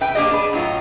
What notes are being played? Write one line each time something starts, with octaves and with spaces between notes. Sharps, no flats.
B4 E5 G5
A#3 D4 G4 C5 D#5
D4 G#4 B4 D5
A2 F#3 D#4 F4